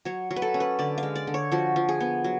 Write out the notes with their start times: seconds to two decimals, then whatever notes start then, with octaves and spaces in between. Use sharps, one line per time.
0.05 F#3 C#5
0.31 F#3
0.36 B4
0.42 A4
0.54 C#4
0.60 B4
0.79 D3 D5
0.98 F5
1.03 G#3
1.15 D5
1.27 D3
1.34 C#5
1.52 F3 F#4
1.76 F3
1.89 G#4
2.00 B3
2.24 F#3